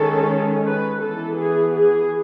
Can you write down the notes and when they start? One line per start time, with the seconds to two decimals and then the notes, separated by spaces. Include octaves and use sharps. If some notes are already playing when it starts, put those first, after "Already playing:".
Already playing: D#3 G#3 C#4 A4
0.65 B4
1.01 E3 B3 A4
1.38 G#4
1.75 G#4